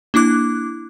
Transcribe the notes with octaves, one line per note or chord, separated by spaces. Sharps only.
A#3 D4 E4 D6 F#6